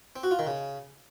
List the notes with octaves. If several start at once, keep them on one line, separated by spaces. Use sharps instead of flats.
C4
F#4
F4
D#3
C#3